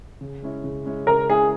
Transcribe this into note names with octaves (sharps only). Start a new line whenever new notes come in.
C#3
G#3 C#4 E4
C#3
G#3 C#4 E4
C#3 A#4
G#3 C#4 E4 G#4